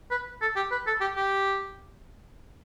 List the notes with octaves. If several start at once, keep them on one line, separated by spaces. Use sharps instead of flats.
B4
A4
G4
B4
A4
G4
G4